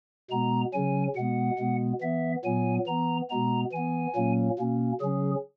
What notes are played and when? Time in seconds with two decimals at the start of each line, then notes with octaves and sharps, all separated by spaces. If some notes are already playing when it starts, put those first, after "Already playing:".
0.31 B2 G#3 B3 A#5
0.73 C#3 F#3 C#4 G#5
1.16 B2 G#3 B3 F#5
1.59 B2 G#3 B3
2.02 E3 B3 E5
2.44 A#2 F#3 B3 G#5
2.87 E3 B3 A#5
3.30 B2 G#3 B3 A#5
3.73 E3 B3 G#5
4.16 A#2 F#3 A#3 C#4
4.59 B2 A#3 C#4
5.01 C#3 F#3 C#4 G#4